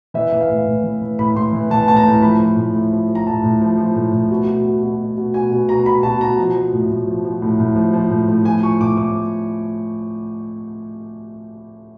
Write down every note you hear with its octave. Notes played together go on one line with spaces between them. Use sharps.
E3 E5
E3
F5
A2
A2
E3
E3
A2 B5
A2 C6
E3
E3 A5
A2 A5
A#5
A2
F3 B5
F3
A2
A2
F3
F3
A#5
A2 A5
A2
F3
F3
A2
A2
B2
B2
B2
B2
B2
B2
B2 G#5
B2
B2 A#5
B2 B5
B2 A5
B2 A#5
F3
F3
A2
A2
F3
F3
A2
A2
F3
F3
A2
A2
F3 G#5
F3 C#6
A2 D6
A2 D6